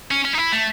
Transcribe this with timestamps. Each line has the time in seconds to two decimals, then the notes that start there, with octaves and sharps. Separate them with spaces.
0.11 C#4
0.25 C#4
0.33 D#4
0.38 E4
0.52 A3